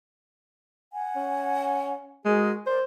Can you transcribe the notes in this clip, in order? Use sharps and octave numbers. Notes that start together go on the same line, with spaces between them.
F#5 G#5
C#4
G#3 F#4 G#4 A#4
A#4 C5 D5